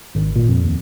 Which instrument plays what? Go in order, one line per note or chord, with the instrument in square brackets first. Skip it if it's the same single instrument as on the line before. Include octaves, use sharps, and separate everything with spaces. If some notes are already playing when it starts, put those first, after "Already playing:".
[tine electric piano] G#1
A#2
F2
D#2